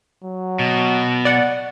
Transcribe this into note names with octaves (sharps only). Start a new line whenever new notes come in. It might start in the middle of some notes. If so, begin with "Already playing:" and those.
F#3
B2
D5 F#5